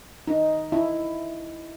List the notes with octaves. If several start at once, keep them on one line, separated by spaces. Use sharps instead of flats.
D#4
E4